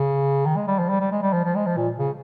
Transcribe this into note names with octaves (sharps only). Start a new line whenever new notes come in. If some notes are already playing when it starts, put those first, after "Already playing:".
Already playing: C#3
D#3
G#3
G3
F3
G3
G3
G#3
G3
F3
F3
G#3
F3
A#2
C#3